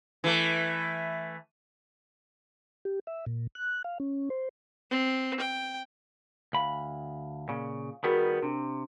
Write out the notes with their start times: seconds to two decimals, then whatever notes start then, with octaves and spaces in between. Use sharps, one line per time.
0.24 E3 A3
2.85 G4
3.07 E5
3.26 A#2
3.55 F#6
3.84 F5
4.00 C#4
4.30 C5
4.91 C4
5.40 G5
6.53 D2 F5 B5
7.49 A#2 C#3
8.04 D#3 G3 B3 F#4 G#4 A#4
8.43 C3 D4